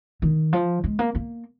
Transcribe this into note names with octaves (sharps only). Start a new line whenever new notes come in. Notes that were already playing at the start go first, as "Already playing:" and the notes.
D#3
F3
G#3
A#3
A#3